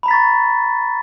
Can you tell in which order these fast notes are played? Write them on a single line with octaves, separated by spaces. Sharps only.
B5 A#5 B6 A6 C#6